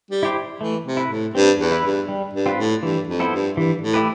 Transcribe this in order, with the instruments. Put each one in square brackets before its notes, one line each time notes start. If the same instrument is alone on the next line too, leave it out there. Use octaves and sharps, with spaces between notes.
[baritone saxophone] G3
[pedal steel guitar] E4 G4 C5
[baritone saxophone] E3 [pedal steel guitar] A3
[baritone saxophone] C3
[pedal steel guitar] E4 B4
[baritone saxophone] A2
[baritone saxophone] G2 [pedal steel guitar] C4
[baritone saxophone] E2
[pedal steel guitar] E4 B4
[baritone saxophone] G2
[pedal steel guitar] G3
[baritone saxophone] G2
[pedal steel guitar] C4 F4 B4
[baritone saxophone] A2
[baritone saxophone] G2 [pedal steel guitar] E3
[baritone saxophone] F2
[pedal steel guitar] B3 E4 A4 C5
[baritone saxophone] G2
[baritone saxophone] G2 [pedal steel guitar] E3
[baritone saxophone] A2
[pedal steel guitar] A3 E4 G4 B4